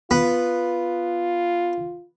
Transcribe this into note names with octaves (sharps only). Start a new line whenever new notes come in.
B3 F4